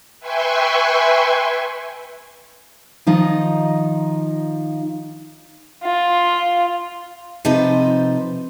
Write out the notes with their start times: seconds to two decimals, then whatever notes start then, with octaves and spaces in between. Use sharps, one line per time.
0.20 B4 E5 G5 G#5 C6 C#6
3.07 D#3 F3 D#4 F4
5.84 F4
7.45 C3 F3 D#4 A4 B4 C5